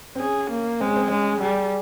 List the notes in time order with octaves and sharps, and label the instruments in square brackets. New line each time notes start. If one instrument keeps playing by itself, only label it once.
[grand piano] C4
[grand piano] C#4 [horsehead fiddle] G#4
[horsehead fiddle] A#3
[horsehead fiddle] G#3 [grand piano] C4
[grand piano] C#4
C4
[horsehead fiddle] G#3 [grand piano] C#4
[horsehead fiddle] G3 [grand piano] G#4